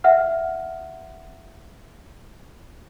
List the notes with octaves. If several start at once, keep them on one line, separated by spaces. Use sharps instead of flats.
E5 F#5 F6